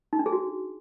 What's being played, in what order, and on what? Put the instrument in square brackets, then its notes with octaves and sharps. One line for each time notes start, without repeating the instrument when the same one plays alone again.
[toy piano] D#4
D4
G#4
F#4